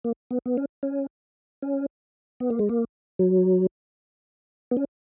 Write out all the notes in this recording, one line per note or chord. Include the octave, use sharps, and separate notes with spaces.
A#3
B3
B3
C#4
C#4
C#4
B3
A#3
G#3
A#3
F#3
B3
C#4